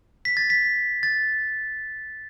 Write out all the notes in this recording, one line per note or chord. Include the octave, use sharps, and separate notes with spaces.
B6
A6
B6
A6